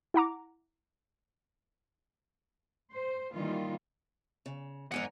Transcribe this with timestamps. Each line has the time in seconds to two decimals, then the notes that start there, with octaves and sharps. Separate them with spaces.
0.14 E4 F#5 A#5 D6
2.92 C5
3.33 D#3 E3 G3 A#3 F4
4.46 C#3
4.92 E2 G#2 A#4 F#5 G#5